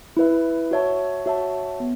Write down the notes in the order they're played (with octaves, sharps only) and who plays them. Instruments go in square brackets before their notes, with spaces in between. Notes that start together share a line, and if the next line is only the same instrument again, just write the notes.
[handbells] E4 B4 E5
F#4 C#5 E5 A5
F#4 C#5 E5 A5
B3